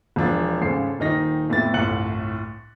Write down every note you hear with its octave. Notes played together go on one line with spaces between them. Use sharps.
E1 F3 D4 A6
G#1 C#3 A4 C5 C7
D#1 D#3 D#4 A#6
F2 A2 B3 E4 A6
G1 C2 A2 F#6 C#7 F#7